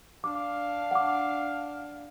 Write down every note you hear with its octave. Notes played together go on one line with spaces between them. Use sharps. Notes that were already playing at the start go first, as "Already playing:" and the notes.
D4 F5 D6
F#5 D6